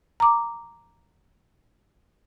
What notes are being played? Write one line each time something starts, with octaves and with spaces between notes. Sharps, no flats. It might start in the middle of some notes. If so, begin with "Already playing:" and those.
A#5 D6